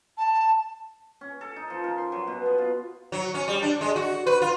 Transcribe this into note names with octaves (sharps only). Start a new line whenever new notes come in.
A5
C#4
A4
D#4
F3
A#4
C6
F#3
B2
B3
F4
F#3
C#4
G3
D4
G#3
F#4
B4
F4